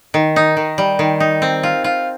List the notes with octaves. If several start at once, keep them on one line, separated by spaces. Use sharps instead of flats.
D#3
D#4
D#3
G3
D#3
D#4
C4
F4
F4